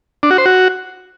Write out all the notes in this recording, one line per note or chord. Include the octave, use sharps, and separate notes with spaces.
D4
F#4
C5
F#4